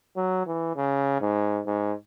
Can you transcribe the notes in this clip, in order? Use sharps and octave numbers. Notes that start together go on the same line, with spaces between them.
F#3
E3
C#3
G#2
G#2